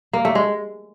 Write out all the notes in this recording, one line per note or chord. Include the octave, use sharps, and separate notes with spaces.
A#3
A3
G#3